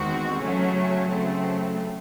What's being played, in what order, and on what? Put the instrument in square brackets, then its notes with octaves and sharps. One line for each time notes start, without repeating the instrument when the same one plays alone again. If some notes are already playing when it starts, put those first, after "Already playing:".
Already playing: [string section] E2 D#3 G#3 C4 F#4
C#3 F#3 A3 C#4
C#3 F#3 A3 C4